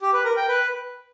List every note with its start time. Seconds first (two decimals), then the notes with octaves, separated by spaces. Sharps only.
0.01 G4
0.13 B4
0.25 A#4
0.37 G5
0.48 B4